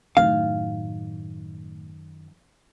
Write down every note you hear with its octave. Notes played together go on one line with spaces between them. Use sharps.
F#2 A2 D#3 F5